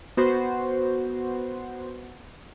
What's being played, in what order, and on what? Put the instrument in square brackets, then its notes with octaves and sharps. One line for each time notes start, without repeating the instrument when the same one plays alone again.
[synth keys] B3 F#4 C5